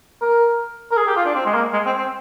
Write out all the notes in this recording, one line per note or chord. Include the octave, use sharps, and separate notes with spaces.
A#4
A#4
G#4
G4
F4
D4
C4
G#3
A#3
G#3
C4
C4